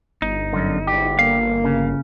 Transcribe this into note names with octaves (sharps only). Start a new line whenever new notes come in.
G1 D#4
F#2 D3
G#2 D3 D4 E4 G4
A#3 F5
C#3